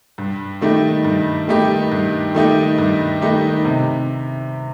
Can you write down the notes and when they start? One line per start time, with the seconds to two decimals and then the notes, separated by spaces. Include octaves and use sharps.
0.18 G2
0.61 D#3 A3 D#4 G4
1.05 G2
1.48 D#3 A3 D#4 G4
1.91 G2
2.34 D#3 A3 D#4 G4
2.78 G2
3.22 D#3 A3 D#4 G4
3.64 C3